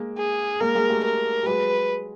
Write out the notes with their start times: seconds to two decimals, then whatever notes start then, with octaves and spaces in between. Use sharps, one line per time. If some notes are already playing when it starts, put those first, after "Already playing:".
Already playing: G#3 A#3
0.18 G#4
0.60 G#3 A#3 A#4
0.75 G#3 A#3
0.90 G3 A3
1.04 A#4
1.43 G3
1.46 F#3 G#3 B4